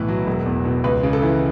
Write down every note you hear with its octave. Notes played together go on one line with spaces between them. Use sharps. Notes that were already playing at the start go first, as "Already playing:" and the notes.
Already playing: B1 A2 E3 B4
F#3
E1
E2
B2
C#2 B4
C#3
A4
E3